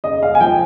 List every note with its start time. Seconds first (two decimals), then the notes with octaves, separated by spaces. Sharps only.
0.04 C#3 D#5
0.23 F5
0.35 G#5
0.40 F3 G5